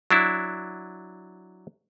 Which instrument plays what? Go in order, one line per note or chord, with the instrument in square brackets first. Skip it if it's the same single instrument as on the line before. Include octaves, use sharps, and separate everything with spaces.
[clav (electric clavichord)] F#3 D4 E4